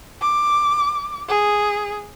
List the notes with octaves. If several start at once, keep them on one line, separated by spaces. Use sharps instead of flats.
D6
G#4